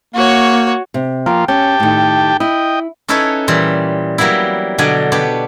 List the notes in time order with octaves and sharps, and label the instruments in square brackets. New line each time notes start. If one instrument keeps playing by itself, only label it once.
[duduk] A#3 [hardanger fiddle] F#4 C#5
[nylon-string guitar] C3
[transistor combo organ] F3 A#3 F4 [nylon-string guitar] G5
[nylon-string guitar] C#4 [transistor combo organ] G4 G5 A5
[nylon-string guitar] A2 D#3
[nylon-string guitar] E4 [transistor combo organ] D#5 G5
[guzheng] C#4 D#4 E4 A4 B4 C#5
A#2 E3 G3
F#3 G3 A#3 B3 E4
B2 D3 F#3 D5 G#5
B3 D4 G4 C#5